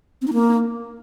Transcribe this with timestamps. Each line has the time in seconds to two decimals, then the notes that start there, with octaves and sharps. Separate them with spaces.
0.22 C4
0.27 D#4
0.33 A#3